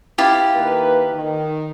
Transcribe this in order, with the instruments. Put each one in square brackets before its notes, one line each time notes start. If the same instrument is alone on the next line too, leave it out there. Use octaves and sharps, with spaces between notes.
[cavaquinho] E4 F4 G4
[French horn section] D#3 A#3 B4
D#3